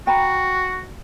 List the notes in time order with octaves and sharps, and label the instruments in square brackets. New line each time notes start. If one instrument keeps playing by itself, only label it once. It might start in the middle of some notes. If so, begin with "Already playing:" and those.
[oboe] F#4 [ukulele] G5 A#5 B5